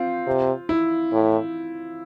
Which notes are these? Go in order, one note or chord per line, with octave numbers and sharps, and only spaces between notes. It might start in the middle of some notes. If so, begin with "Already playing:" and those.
Already playing: C4 F4
C3
E4
A2